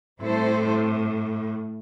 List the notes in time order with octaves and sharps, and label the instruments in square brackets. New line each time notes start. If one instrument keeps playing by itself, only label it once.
[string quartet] A2 [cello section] G3 C4 E4 A4 C5